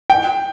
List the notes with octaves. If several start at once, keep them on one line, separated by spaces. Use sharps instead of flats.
G5